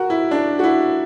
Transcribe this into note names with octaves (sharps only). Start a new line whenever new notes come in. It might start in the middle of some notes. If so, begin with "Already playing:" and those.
Already playing: F#4 A#4
E4
D4
F#4
E4